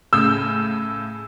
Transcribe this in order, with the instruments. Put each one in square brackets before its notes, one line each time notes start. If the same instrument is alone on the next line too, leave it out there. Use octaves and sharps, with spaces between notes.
[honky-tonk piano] A2 C#3 G6 [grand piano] E6